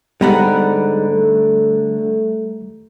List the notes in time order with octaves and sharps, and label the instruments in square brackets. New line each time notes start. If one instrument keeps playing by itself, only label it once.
[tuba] G#2 [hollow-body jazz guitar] D3 B3 F#5 [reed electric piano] G3 A#5 F#6
[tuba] A3